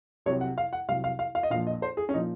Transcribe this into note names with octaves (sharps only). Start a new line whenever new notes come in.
C2 C3 F#3 C#5
F#5
F5
F#5
C2 C3 F#3 F5
F5
F5
F5
D#5
A#1 A#2 F3 F5
D#5
C5
G#4
C#4
A#2 F3 D#4